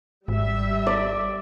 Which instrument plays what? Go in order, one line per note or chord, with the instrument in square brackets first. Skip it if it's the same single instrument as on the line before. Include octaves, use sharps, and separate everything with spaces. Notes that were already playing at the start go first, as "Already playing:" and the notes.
[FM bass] G#1 [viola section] G3 E5
[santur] D5